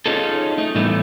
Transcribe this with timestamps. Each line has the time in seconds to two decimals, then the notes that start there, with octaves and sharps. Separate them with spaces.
0.06 C#4 D#4 F4 G#4 A4
0.58 A3 D#4
0.75 A2 E3 G3 A3 B3